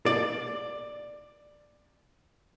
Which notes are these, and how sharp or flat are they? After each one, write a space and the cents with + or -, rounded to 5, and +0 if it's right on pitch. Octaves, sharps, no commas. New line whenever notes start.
D5 +10